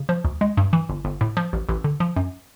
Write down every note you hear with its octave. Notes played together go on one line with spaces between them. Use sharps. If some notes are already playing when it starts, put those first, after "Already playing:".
Already playing: C#3
F3
D2
G#3
G2
E3
G1
G1
A2
F3
A1
A1
D3
F3
F#2